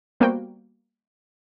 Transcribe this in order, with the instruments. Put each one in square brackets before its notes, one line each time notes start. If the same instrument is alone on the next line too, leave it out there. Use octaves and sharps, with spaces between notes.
[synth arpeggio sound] G3 A#3 B3 F#4 C5 G5